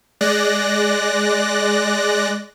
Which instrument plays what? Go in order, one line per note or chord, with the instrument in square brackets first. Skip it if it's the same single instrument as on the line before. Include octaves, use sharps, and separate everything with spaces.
[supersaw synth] G#3 D5 F#6 A#6